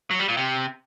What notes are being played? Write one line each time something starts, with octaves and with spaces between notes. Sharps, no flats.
F#3
G3
A#2
C3